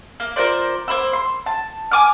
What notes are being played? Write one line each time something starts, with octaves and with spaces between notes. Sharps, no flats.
A#3
F4 A#4 C5 D5
A#3 C5 B5 E6
C6
A5
G#5 D6 D#6 F6